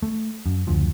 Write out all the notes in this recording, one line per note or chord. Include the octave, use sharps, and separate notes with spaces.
A3
F#2
F#1 D2 F3